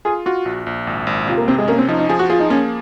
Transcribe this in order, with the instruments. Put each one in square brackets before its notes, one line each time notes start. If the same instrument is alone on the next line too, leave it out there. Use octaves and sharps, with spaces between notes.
[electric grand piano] F4 [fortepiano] G#4
[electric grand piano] F4 [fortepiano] F#4
[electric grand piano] A#1
A#1
G#1
G#1
[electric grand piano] C3 [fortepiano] F4
[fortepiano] A#3
[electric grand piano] C3 [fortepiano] C4
[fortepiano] G#3
[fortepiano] A#3 [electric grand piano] C#4
[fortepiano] C4
[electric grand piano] F3 [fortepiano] D#4
[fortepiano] D#4
[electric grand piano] F3 [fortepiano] G#4
[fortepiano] F#4
[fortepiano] F4 [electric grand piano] G#4
[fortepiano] D#4
[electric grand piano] A#3 [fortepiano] C#4